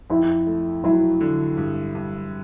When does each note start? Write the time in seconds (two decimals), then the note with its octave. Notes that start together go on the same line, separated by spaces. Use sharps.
0.10 F2 E4
0.47 A3
0.84 F#3 E4
1.21 D3
1.57 G2
1.95 G2